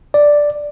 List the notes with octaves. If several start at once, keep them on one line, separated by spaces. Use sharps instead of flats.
D5